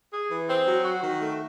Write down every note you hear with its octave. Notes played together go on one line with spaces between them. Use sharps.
G#4
E3
C4
F#3
F#4
D#3
A3